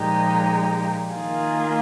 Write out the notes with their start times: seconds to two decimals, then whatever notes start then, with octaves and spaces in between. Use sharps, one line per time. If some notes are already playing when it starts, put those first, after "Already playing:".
Already playing: A#2 F3 G#3 D#4 G4
1.14 D#3 A#3 F4 G#4